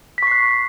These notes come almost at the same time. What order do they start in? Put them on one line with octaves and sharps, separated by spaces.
B6 C#6 C7 F#6